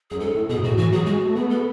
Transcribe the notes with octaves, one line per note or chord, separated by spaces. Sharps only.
F#2 G#4
G#2 A4
A2
B2 G#4
G#2
A2 F#4
E3 F#4
F#3 G#4
G#3 F#4
A3
B3 G#4
A4